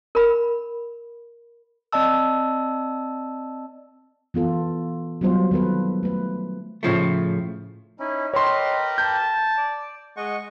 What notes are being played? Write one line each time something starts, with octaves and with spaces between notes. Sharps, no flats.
A#4 B5
C4 D5 D#5 A5 E6
E3 B3 F4 A4
F#3 G3 B3 F4 C5
D#3 B3 A4 B4
A3 B4
A2 C#3 F3 A3
C#4 D#4 E4
G4 A#4 B4 C#5 D#5 C6
A5 G6
D5
G#3 D#5 F#5 C#6